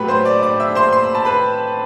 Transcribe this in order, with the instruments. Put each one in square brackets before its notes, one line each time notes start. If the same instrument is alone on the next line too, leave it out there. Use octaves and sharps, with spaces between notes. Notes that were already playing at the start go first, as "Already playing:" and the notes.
Already playing: [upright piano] A2 F#3 A3 G4 B4 B5
C5 C6
D5 D6
D5 D6
E5 E6
C5 C6
C6
B5
A5
B4 B5